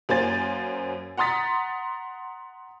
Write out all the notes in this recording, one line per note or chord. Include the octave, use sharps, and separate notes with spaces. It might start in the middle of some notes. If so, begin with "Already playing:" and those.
F#2 A#3 C5 G#5 A6
F#5 A#5 C6 D#6 A6 B6